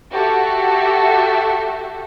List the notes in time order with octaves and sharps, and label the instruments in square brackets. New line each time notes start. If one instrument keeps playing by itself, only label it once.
[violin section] F#4 G4 A4 E5